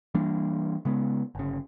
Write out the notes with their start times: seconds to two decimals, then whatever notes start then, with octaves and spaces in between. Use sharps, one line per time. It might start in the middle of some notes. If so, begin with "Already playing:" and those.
0.14 E3 G3 A#3 D4
0.85 C#3 G#3 B3
1.35 G1 C#3